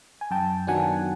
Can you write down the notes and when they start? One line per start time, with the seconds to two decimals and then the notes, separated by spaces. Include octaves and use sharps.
0.21 G#5
0.30 F#2 G5 A5
0.67 D#3 F#3 B3 D4 F#5 G#5